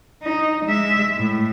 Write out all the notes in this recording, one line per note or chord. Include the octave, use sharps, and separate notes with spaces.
D#4
G#3 E5
A2